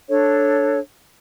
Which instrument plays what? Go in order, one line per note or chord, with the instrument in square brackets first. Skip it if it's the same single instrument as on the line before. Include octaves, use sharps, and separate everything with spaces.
[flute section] D4 A4 C#5